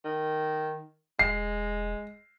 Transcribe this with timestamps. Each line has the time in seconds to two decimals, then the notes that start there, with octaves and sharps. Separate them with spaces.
0.04 D#3
1.19 E1 G#3 C7